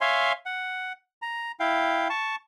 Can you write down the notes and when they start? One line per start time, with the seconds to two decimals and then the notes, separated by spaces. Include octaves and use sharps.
0.01 C#5 E5 F5 G#5 C6
0.46 F#5
1.22 A#5
1.60 E4 F5 G5
2.10 A5 C#6